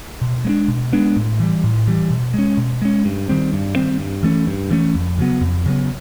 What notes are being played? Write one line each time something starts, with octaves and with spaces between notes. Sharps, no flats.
B2
G#3 B3 D4
B2
G#3 B3 D4
A2
E3 G3
A2
E3 G3
B2
G#3 C#4
B2
G#3 C#4
G2
D#3 G3 C4
G2
D#3 G3 C4
G2
E3 A3 C#4
G2
E3 A3 C#4
F2
C#3 F#3 B3
F2
C#3 F#3 B3